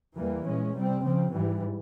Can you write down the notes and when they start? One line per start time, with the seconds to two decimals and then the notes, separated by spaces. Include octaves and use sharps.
0.16 E2 E3 G3 A#3
0.46 A#2 G#3 C#4
0.74 C3 G3 C4
1.04 C#3 F3 C4
1.33 G#2 E3 G3